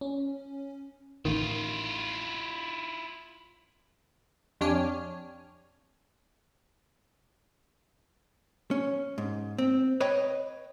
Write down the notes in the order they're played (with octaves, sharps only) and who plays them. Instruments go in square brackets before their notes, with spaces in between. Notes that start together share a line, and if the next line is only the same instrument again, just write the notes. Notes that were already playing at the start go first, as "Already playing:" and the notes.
[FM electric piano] C#4
[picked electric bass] A1 D#3 [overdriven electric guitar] E4 F4
[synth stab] F2 D4 G4 C#5 G#5 F6
[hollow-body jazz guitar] C#4
G#2
C4
B4 C#5 D#5 G5 B5